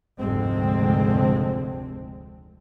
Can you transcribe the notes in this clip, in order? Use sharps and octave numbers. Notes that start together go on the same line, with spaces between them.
F1 D2 G#2 D3 G#3 C4